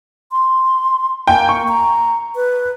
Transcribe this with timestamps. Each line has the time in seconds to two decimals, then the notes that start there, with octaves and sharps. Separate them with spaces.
0.32 C6
1.27 A#3 G5 G#5
1.49 C#6
1.68 A#5
2.35 B4